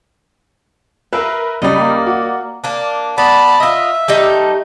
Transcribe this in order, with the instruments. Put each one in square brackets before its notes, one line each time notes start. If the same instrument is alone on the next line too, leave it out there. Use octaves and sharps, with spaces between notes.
[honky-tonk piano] A#4 B4 [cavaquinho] E5 F5
[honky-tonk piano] C#2 G3 [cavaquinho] D5 D#5
[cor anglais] A#3
[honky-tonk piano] F#4
[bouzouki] A#3 D4
[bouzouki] B3 [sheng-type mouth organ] D5 A5 B5
[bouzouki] F4 D#5 [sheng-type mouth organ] E5
[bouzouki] G3 A3 D#4